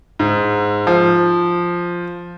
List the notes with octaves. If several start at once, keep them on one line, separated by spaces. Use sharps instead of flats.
G#2
F3